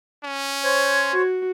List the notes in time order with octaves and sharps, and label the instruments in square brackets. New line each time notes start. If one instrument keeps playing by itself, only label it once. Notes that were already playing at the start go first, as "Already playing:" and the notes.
[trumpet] C#4
[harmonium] C5 C#5 [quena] G#6
[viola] F#4